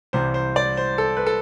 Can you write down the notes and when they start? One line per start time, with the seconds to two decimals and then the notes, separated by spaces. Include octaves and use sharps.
0.13 C2 C3 E3 G3 C5
0.34 C5
0.56 D5
0.77 C5
0.98 A4
1.17 B4
1.27 A4